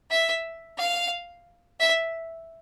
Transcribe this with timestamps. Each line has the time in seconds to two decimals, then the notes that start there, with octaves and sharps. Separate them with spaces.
0.10 E5
0.78 F5
1.80 E5